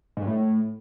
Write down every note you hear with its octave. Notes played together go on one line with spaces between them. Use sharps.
G#2
G2
A2